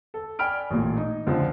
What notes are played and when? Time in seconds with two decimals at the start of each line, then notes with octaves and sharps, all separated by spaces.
0.14 A4
0.39 D5 G5 G#5 B5 F6 D7
0.70 A1 A#2 A3
0.97 D#4
1.27 C#2 G#2 D3 F3